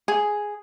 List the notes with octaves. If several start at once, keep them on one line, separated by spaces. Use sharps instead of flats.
G#4